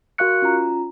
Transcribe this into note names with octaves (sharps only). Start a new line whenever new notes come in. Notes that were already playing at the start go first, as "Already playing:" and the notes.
F#4 A#4 F5 C#6 F#6 C#7
C#4 F4 A#5